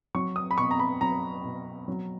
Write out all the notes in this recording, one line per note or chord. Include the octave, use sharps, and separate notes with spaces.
F#3 C#6
D#6
B5
B2 C#6
A#5
B5
F#3 A#5
B2
F#3